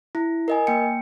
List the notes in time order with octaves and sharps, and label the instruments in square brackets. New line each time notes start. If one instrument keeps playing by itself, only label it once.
[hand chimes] E4
A#4 D#5 G#5
A#3 G5 C#7